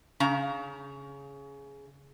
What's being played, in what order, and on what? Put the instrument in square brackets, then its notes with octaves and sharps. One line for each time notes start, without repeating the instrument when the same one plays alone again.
[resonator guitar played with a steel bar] C#3 A#5